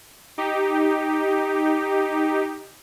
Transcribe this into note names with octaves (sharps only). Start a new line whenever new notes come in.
D#4 G4